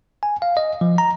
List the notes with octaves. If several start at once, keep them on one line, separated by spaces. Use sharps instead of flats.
G#5
F5
D#5
F3
A#5